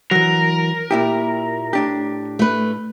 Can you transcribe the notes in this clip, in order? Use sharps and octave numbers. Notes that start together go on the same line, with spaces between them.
E3 F#3 A#4
A#2 E4 G4
A2 D4 G4
A3 B4